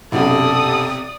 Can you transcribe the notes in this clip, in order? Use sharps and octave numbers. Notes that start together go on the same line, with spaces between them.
B1 F#2 C3 A4 D5 D#6